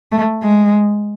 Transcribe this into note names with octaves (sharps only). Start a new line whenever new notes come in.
A3
G#3